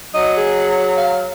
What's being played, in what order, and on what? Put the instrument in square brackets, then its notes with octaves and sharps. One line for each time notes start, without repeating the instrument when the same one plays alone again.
[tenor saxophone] F#3 [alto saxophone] D#5
[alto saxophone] G#4
F5